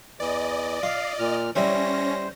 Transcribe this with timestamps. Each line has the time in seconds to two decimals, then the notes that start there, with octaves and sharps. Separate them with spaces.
0.20 E2 E3 D5 D#5
0.83 F4 F5
1.19 A#2 F6
1.56 G3 C#4 E4 C5 C#5 A#6